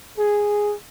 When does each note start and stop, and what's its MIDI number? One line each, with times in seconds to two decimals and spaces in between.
0.18 0.73 68